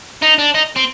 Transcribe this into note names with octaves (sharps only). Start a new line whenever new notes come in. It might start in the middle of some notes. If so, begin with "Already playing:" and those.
D#4
D4
D#4
C4